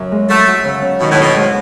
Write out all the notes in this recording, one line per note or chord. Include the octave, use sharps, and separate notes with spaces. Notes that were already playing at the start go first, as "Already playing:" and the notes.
Already playing: F#2 C#3
G#3
F#3 A3
F#4
C#3
C#4
B2 D#3
A2
B2 C#4
G#2